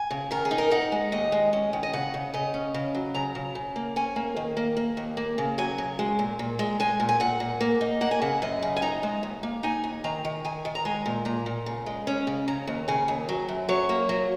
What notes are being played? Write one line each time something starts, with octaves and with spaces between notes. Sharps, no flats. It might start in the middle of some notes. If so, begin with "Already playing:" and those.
Already playing: G#5
C#3
D#3 A#4
G#4
D#4
A#4
D#4 F#5
G#3
D#2 D#5
G#3
C#4
D#3
D#5
C#3 F#5
C#3
C#3 D#5
C#4
C#3
F#3
C#3 A#5
C#3
C#3
A#3
C#4 G#5
A#3
D#3
A#3
A#3
D#2
A#3
C#3
F#3 G#5
C#3
G#3
A#2
A#2
G#3
G#3 G#5
A#2
G#5
A#2 F#5
A#2
A#3
D#4
A#3 F#5
G#5
C#3 F#5
F#2 D#5
C#3
G#5
D#4 A#5
G#3
D#2
A#3
D#4 G#5
D#2
D#3 A#5
D#3
D#3 G#5
D#3
A#5
G#3 G#5
A#2
A#2 A#5
A#2
C#3
G#3
C#4
C#3
C#3 A#5
D#2
C#3 G#5
D#2
F#3
F#2
F#3 C#5
A#3
F#3